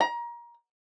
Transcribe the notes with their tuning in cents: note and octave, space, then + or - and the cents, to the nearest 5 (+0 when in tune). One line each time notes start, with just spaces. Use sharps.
A#5 +25